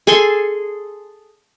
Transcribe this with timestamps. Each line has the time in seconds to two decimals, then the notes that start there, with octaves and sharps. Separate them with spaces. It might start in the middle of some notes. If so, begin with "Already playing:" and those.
0.07 G#4 A4 G#5 C6